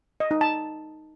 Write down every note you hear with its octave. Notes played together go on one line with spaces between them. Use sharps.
D#5
D#4
A5